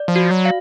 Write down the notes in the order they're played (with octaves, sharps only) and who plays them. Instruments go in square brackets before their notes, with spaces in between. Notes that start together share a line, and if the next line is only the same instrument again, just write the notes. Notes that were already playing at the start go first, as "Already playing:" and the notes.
Already playing: [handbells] D5
[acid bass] F3
[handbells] F#4
[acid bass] F#3
[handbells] F5